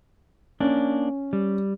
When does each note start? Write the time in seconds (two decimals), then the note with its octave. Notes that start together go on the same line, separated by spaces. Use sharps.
0.60 A#3 C#4 D4
1.33 G3